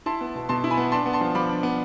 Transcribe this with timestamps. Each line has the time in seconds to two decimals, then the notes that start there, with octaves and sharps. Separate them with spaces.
0.06 E4 A5 C6
0.21 B3
0.35 B2
0.49 B2 A5 C6
0.64 E4
0.70 G#5 B5
0.77 B3
0.92 D4 A5 C6
1.06 B3
1.13 A5 C6
1.21 F3
1.35 F3 B5 D6
1.49 D4
1.63 B3